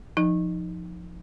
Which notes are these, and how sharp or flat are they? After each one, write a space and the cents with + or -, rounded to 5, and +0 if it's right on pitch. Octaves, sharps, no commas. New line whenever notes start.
F3 +5 D#4 +0